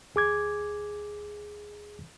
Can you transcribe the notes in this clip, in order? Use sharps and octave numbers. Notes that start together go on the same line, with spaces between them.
D2 G#4 D6 G#6